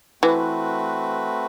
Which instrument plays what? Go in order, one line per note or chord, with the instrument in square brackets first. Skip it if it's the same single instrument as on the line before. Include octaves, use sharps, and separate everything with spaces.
[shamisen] E3 [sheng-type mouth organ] A3 C4 F#4 B4